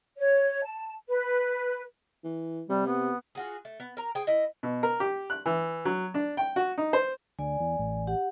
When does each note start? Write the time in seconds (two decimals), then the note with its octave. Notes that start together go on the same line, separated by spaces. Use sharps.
0.17 C#5
0.64 A5
1.08 B4
2.24 E3
2.69 C3 G3
2.87 B3
3.35 F4 F#4 G#4
3.65 A3
3.80 B3
3.97 A#4 A#5
4.15 G#4 C5 G5
4.27 E4 D#5
4.63 B2
4.83 A#4
5.00 G4
5.30 F#6
5.46 E3
5.85 F#3
6.14 D4
6.37 G5
6.56 F#4
6.78 D#4
6.93 C5
7.39 D2 D5 G#5
7.60 E2
7.79 A1
8.07 G4 F#5